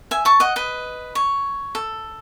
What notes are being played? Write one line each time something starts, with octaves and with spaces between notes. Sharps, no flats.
E5 G#5
A5 C#6
D#5 F#5
B4 D#5
C#5
A4